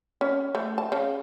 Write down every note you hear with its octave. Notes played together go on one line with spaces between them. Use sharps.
C#4
A3
A5
C#3